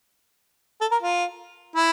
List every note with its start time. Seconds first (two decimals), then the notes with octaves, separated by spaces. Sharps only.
0.81 A4
0.91 A#4
1.02 F4
1.76 E4